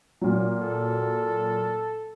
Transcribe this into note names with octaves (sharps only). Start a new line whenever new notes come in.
A#2 F#3
A4